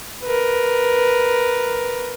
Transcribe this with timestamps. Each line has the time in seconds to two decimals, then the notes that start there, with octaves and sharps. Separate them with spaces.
0.24 A#4 B4